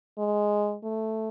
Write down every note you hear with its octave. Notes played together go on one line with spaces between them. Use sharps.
G#3
A3